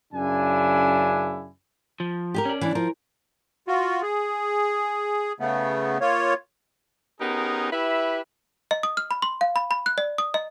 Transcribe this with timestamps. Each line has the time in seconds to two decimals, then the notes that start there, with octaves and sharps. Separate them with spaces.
0.13 F#2 C#3 D4 E4 G#5
2.00 F3
2.34 G4 G#4 A#4
2.46 C#4 D5
2.61 E3 D4
2.75 F3 A#4
3.68 F4 F#4
4.02 G#4
5.40 C#3 A3 B3
6.01 A#3 F4 C#5
7.21 B3 C#4 D#4 G4 G#4 A#4
7.72 E4 G4 B4 E5
8.71 D#5
8.83 D#6
8.97 F6
9.11 B5
9.22 C6
9.41 F5
9.56 B5
9.71 B5
9.86 F#6
9.98 D5
10.18 D#6
10.34 D#5